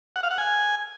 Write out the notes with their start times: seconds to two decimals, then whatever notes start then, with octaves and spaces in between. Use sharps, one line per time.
0.16 F#5
0.23 F5
0.31 F#5
0.38 G#5